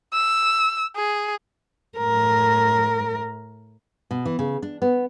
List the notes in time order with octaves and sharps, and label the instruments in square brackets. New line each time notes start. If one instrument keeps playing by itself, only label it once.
[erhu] E6
G#4
[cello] A2 A#4
[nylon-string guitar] B2
E3
C#3
D4
B3